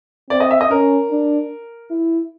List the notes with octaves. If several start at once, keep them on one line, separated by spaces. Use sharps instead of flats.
C4 D5
D#5
E5
D#5
C#4 A#4
D4
E4